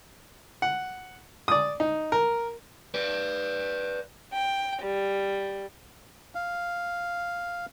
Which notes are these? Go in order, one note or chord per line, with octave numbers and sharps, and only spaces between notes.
F#5
D5 D#6
D#4
A#4
B4 D5
G5
G3
F5